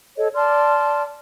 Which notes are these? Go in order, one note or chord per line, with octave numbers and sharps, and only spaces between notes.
A4 C#5 D#5
D5 A5 C6 F6